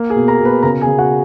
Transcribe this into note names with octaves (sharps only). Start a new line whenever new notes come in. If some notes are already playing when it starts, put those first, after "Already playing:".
Already playing: A#3
G#4 G#5
B2
A#4 A#5
B2
B4 B5
C#3 A#4 A#5
G#4 G#5
C#3
F#4 F#5